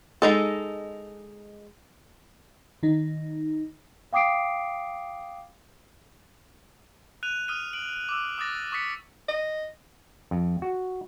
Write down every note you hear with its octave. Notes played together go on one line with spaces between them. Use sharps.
G#3 D#4 A4
D#3 D#4
F5 G5 D6 D#6 C7 D7
F#6 D#7 F7
D#6 F6 D#7
D#6 D7 F#7
D6 E6
D6 D#6 F#6 A6 A#6
C#6 D#6 A6 B6 C#7
D#5
F2
F#4